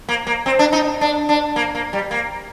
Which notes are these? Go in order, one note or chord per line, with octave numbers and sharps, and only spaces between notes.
A#3
A#3
C4
D4
D#4
D4
D4
A#3
A#3
G3
A#3